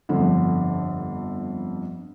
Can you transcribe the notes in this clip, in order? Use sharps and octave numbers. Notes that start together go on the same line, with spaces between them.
G1 F2 D3